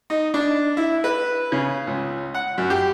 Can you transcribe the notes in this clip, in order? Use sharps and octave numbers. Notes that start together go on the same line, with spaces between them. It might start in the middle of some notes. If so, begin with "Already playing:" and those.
D#4
D4
E4
B4
C#3
C#2
F#5
F#2
G4